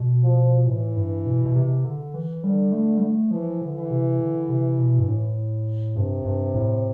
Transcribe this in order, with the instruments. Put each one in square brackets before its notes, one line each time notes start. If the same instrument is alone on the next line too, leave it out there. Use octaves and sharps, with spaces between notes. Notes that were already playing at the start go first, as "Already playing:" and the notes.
Already playing: [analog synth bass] B2
[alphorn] F3
[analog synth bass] A2 [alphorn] E3
[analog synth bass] G2
B2
B2
C3
D3
E3
[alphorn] D3 [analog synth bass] G3
[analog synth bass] A3
G3
A3
[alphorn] E3 [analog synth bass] F3
[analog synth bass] D3
[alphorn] E3
[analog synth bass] C3
D3
C3
B2
G2
A2
[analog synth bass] G2 [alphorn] C3
[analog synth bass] G2
A2